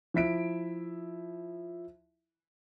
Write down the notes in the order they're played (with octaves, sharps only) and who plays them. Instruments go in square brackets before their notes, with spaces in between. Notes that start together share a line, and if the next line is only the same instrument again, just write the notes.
[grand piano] F3 E4 E5 B6 D7